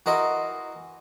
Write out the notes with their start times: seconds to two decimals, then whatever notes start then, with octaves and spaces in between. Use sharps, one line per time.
0.06 E3 F#4 A#4 D#5 C6